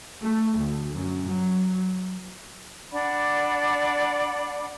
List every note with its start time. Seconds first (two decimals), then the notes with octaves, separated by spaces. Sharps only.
0.20 A3
0.58 D2
0.93 F#2
1.27 F#3
2.93 D4 D5 F#5 B5